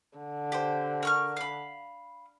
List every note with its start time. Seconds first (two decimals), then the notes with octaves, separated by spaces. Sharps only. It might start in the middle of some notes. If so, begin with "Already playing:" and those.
0.18 D3
0.52 G4 C5
1.03 A#4 C#6 F6
1.37 F5 B5